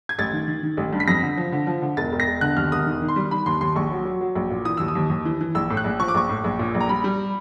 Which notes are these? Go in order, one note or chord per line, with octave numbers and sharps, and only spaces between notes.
G#6
A1 A6
D#3
D#3
D#3
A1
G2
B6
F2 A#6
D3
F3
D3
F3
D3
E1 A6
E1
A#6
E1
D3 F#6
D#2 F6
E1 D#6
D#3
D#3
C6
G3
D#3 B5
D#2 C6
D#2 C6
A#1 C#6
F#3
F#3
F#3
A#1
A#2
E3 D#6
D#2 E6
D#6
D#2
D#2
E3
E3
A#1 E6
A2
F#6
A#1
F3 C#6
D6
A#1 C#6
A2
A#1
A#2
A#1
A#5
G3 B5
G3